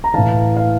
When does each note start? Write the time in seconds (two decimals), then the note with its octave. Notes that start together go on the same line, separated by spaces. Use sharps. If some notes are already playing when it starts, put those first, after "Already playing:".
0.04 A#5
0.14 A2 E3 F5 A5
0.56 F5